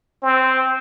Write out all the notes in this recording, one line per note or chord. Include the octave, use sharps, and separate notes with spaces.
C4